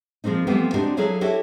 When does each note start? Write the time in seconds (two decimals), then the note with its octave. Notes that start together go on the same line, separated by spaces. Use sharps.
0.24 F3 G#3 A#3 C4 D#4
0.47 E3 F3 G3 A3 B3 C4
0.74 G#3 C4 D4 D#4 F#4 G4
0.97 F#3 E4 G#4 A4 C#5 F5
1.21 E4 F#4 G4 A4 C#5